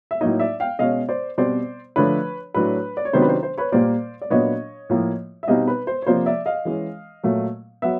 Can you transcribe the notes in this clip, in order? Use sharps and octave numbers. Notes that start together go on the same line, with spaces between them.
E5
A2 F#3 A#3 D#4 C#5 D#5
D5 E5
F5 G5
B2 G#3 C#4 D#5 F5
C5 D5
B2 G3 C4 C5 D5
D3 F3 A3 D4 B4 C#5
A2 F#3 A3 D4 B4
D5
C#5
C3 D#3 F#3 B3 D4 C5
B4
C5
C5
B4 C#5
A#2 G3 A#3 C5 D5
D5
A#2 F#3 B3 D4 C#5 D#5
A2 F3 A#3
E5
B2 G3 C4 D#4 D#5 F5
B4
C5
C#5
C3 F3 A#3 C5 D5
D5 E5
D#5 F5
E3 G#3 C#4
A#2 F#3 A3
F#3 B3 E5 F#5